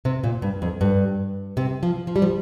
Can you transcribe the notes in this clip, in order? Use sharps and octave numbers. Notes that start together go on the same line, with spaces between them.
C3
A#2
G2
F2
G2
C3
F3
F3
G3
F3